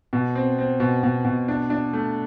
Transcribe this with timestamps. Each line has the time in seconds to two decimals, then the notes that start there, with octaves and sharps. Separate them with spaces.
0.13 B2
0.35 C4
0.58 C4
0.80 B2
1.03 B2
1.25 B2
1.48 D4
1.70 D4
1.93 A3